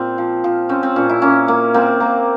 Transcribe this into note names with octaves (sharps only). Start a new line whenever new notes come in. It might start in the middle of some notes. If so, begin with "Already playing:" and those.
Already playing: A#2 C4 F4 G4
F3
F3
C4 C#4
C4
A#2 C#4
E4
A#3 C#4
A#3
A#3 C4
A#3